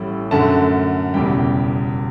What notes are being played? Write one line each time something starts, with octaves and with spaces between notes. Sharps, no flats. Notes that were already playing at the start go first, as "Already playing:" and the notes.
Already playing: A1 A2 G3
F#2 D3 A3 A5
E1 E2 C#3 G3 G5